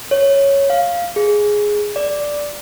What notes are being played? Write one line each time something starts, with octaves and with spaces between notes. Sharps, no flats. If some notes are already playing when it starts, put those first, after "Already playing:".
C#5
F5
G#4
D5